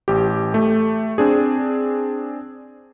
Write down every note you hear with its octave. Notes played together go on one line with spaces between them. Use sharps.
A1 G4
A3 G4
C4 D4 G#4